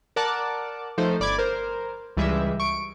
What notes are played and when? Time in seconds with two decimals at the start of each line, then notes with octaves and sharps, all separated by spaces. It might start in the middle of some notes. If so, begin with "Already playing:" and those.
0.16 A#4 D5 F#5 A5 D6 F#6
0.98 F3 A3 D#4 A4 C5
1.20 G1 D5 B5 D6 G#6
1.38 A#4 C5
2.17 C#2 E3 G3 G#3 E5
2.60 C#6 D7